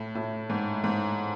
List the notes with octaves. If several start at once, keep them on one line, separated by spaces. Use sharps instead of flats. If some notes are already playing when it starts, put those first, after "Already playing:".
Already playing: A2
A2
G#2
G#2